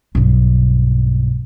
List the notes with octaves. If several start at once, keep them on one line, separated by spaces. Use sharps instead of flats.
B1 G2